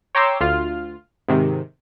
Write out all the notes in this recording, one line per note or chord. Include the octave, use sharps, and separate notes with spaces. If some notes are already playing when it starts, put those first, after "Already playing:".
C#5 G5 A#5 C6 D6 E6
D2 F4 F6
G#2 C3 D#3